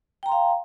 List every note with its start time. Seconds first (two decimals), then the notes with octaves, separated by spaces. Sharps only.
0.23 G5
0.26 A#5
0.29 C6
0.32 F5